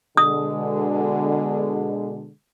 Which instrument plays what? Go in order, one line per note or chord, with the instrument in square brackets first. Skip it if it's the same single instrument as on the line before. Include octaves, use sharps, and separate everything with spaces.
[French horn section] B2 D3 G#3 [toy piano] D#6